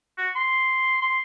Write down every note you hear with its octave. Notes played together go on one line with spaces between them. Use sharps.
F#4
C6
C6